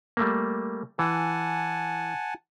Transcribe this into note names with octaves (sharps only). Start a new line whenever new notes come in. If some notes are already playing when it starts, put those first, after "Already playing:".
G3 A3 A#3
E3 F#5 G#5 A5